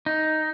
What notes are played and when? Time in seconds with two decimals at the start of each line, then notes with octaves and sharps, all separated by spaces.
0.06 D#4